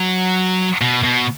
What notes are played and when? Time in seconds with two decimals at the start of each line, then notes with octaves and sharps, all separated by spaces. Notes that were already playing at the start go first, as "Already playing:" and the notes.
Already playing: F#3
0.81 B2
1.04 B2